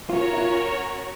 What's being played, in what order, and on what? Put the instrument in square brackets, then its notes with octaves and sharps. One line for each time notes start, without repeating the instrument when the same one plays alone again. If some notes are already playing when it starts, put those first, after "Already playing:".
[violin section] C#4 F#4 A#4 C#5 [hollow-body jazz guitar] F4
[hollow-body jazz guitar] E4
F4